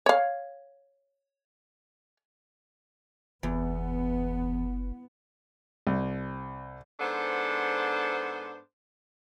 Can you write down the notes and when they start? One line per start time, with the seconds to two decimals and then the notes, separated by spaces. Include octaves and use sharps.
0.06 C#5 F5
3.43 F#1 E2 B3
5.87 C2
7.00 G#2 B3 D4 A4 C5